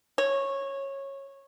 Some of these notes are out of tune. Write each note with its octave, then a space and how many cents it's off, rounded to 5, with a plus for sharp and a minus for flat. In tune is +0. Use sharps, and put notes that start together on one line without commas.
C#5 -15